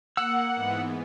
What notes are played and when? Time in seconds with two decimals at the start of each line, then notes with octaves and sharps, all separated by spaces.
0.17 A#3 F#5 E6
0.55 G#2 E3 B3